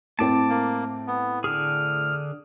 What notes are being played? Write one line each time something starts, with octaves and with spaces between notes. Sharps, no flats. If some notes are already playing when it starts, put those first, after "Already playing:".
A2 C4 A5 D6
A#3
B3
D3 G#4 F6